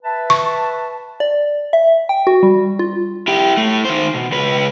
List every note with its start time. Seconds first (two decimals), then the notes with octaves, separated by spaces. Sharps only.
0.03 B4 E5 A5
0.30 C#6
1.20 D5
1.73 E5
2.09 G5
2.27 F#4
2.43 G3
2.79 F4
3.28 E4 G4
3.57 A2 A3
3.85 D#3 C5
4.15 B2
4.32 C#2 B4